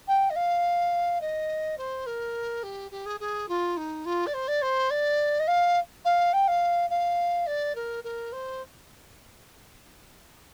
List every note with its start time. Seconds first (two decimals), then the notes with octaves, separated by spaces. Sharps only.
0.07 G5
0.30 D#5
0.35 F5
1.21 D#5
1.77 C5
2.06 A#4
2.63 G4
2.91 G4
3.05 G#4
3.20 G#4
3.48 F4
3.77 D#4
4.05 F4
4.26 D5
4.34 C5
4.48 D5
4.62 C5
4.90 D5
5.39 D#5
5.47 F5
6.04 F5
6.33 G5
6.47 F5
6.90 F5
7.46 D5
7.75 A#4
8.04 A#4
8.32 C5